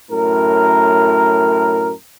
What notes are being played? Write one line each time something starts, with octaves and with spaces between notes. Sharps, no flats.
F#2 A2 A#4